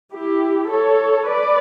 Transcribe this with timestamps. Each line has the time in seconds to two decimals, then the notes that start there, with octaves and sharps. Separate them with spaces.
0.14 E4 G4
0.71 A4 C#5
1.28 B4 D5